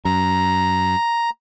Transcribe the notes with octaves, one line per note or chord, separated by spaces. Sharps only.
F#2 A#5